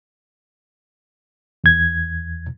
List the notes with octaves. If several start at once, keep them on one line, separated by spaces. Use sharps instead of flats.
E2 G#6